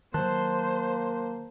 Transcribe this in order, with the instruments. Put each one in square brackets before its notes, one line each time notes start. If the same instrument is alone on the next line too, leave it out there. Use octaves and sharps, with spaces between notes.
[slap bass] D#3 F#3 [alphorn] A#3 [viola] C5 [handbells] A5 C6 F#6